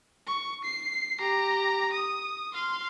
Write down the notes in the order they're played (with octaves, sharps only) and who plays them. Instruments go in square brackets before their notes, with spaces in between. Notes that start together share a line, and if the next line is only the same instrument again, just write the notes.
[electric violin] C#6
C7
G4 A#5
D#6
F5 C6